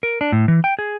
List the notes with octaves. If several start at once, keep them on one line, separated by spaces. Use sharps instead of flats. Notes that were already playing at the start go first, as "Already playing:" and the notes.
A#4
D4
A2
E3
G5
G#4